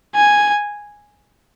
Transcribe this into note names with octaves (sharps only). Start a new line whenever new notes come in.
G#5